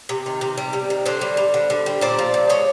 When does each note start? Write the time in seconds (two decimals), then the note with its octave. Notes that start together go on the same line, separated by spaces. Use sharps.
0.09 C3
0.26 D#3
0.41 C3
0.57 G3
0.73 C3
0.90 D#3
1.06 D3 C5 D5
1.21 G3
1.37 G3
1.54 D3
1.70 D3
1.86 G3
2.01 A#2 C5 D5
2.19 F3
2.34 A#2
2.49 G#3 C#5 D#5